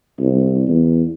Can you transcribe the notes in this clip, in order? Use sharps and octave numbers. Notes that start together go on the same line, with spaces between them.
C2
E2